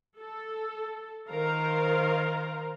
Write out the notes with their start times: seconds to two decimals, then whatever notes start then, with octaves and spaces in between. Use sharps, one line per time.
0.19 A4
1.30 D#3 A#4 C5 F5 A#5